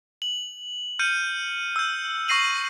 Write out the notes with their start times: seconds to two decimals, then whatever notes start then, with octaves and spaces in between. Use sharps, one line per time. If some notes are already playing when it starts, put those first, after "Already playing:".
0.22 F#7
0.99 F6 G6 C#7 D#7
1.76 E6 G6
2.28 C#6 E6 A#6 C7 D#7 F#7